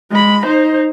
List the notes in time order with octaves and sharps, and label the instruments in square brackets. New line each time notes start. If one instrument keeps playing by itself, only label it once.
[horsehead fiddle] G#3 B5
D#4 C5